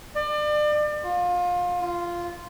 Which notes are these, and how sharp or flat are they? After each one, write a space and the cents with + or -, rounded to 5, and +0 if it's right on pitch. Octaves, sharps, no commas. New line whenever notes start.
D5 +35
F4 +25
F4 -10